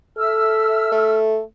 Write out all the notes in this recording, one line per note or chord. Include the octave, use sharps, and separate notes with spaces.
A4 E5 E6 F6
A3